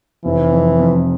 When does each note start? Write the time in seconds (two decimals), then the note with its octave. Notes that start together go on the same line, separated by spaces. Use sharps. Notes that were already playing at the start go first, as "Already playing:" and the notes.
0.24 F1 E3
0.52 F2
0.79 F2